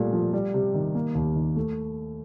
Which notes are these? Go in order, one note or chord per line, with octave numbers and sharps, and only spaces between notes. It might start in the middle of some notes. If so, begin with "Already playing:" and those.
Already playing: A#2 G3 A3
F3
G3
C3
D#3
A#3
D#2
D#3
A3